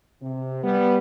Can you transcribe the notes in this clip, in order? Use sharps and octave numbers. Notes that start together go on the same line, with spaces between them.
C3
G3 B3